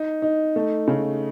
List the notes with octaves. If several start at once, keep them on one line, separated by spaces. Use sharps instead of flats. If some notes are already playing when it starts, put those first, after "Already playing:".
Already playing: D#4
D#4
A3
C#3